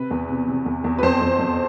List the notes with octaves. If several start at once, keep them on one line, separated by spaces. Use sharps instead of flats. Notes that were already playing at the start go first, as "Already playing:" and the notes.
Already playing: C3 B4
E2
C3
C3
E2
E2
B4
F2 C5
F2
F2